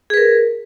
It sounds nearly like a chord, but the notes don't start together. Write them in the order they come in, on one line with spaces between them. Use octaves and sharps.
G#4 B4 A#4